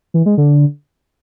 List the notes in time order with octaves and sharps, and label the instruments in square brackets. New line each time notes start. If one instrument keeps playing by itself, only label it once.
[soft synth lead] E3
G#3
D3